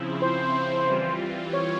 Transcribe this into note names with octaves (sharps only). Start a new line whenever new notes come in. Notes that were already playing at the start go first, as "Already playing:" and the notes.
Already playing: C#3 F3 C4 E4
C5
E3 G3 C4 F4
C#5